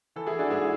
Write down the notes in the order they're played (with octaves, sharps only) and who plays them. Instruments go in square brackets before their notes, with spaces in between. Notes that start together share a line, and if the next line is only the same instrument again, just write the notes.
[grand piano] E3 A4
E4 G#4
E3
D4 F#4
G#2 E4 G#4